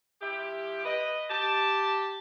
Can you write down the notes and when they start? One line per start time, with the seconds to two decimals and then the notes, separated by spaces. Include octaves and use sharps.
0.21 F3 E4 G4
0.85 B4 D#5
1.30 G4 A5